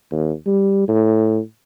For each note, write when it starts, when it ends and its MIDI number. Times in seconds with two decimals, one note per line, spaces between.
0.12 0.33 39
0.46 0.88 55
0.88 1.39 45